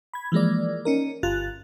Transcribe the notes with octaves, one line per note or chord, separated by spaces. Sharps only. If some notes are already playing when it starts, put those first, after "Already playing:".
B5 G#6
E3 F3 G#3 A#3 D5
C#4 D#4 A#4
G1 F4 F#6 A6